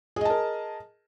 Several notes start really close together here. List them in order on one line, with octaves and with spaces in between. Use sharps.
G#4 D#5 A5 A#4